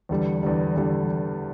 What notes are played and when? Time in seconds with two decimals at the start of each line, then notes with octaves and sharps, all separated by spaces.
0.09 E2 D3 G3
0.43 E2 D3 G3
0.76 E2 D3 G3